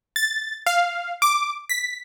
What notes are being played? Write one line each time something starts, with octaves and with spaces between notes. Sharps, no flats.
A6
F5
D6
B6